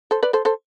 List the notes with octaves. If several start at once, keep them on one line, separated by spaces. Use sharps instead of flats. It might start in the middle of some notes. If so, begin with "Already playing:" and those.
A4 C5
B4 D5
A4 C5
A4 C5